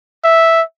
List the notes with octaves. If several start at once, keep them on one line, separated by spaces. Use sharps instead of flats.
E5